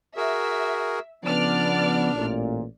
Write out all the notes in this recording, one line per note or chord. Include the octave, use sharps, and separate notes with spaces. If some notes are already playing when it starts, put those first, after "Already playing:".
F#4 G#4 A#4 E5
C#3 F3 B3 D4 D5 F6
A1 A#2